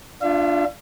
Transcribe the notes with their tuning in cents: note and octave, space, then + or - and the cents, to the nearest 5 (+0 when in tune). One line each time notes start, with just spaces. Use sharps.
D4 +0 F4 +0 E5 +45